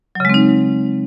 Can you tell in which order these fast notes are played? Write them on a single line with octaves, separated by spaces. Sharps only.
F#3 C#3 G#3 C4 D#4